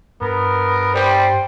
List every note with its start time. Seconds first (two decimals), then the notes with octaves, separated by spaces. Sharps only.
0.21 G2 B3 A#4
0.94 G3 C5 G5